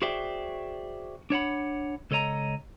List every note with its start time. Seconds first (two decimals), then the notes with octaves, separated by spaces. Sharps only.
0.02 F#4 G#4 C5 D5 E5 G5
1.30 D4 C#5 F#5 B5
2.11 C#2 A4 C#5 D#5 A#5